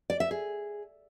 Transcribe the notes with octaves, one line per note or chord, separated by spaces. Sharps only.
D5
E5
G#4